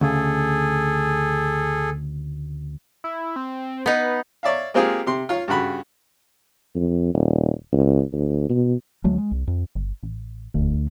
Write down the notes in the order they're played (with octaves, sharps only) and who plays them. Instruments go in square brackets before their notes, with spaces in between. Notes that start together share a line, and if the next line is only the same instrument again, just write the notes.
[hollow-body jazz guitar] D2 C#3 [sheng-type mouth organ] G#4 A4
[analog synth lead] E4
C4
[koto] B3 D#4 [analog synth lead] B4
[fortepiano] C#5 D5 E5 F5
G#3 A#3 C4 F4 G4 G#4
C3 C6
F4 C#5 F5
G2 C#3 F#4 B5
[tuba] F2
D#1
C#2
D2
B2
[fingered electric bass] D2 F#3 G#3 A3
G#3
C2
F2
[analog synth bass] G1
A1
[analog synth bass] E1 [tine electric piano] D2